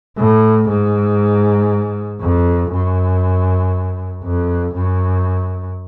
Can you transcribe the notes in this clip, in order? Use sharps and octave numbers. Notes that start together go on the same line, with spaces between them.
A2
G#2
F2
F#2
F2
F#2